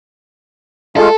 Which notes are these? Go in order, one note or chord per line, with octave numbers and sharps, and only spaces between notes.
G#3 A3 F4 A4